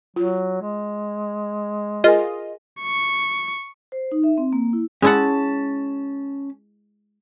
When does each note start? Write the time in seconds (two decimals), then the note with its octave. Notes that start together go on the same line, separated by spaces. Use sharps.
0.16 F#3 F4
0.62 G#3
2.04 F4 G#4 A#4 D#5 G#5
2.82 C#6
3.92 C5
4.12 D#4
4.24 E5
4.38 C4
4.53 A#3
4.73 E4
5.02 G#3 C#4 E4 F#5 A5